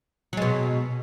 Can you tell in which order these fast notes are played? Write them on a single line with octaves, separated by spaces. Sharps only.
F#3 G#3 B2